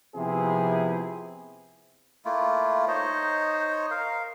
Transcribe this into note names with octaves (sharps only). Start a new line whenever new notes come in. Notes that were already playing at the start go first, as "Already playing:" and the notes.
C3 F3 B3 C4 E4 G#4
A3 A#3 E4 F4
D#4 C5 C#5 D#5
A#4 F5